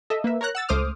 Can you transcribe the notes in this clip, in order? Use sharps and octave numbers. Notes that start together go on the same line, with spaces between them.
A4 D#5 E5
A#3 B4 E5
A#4 C#5 A#5 F#6
F#5 E6 A6
C#2 A3 C5 D6 D#6 F6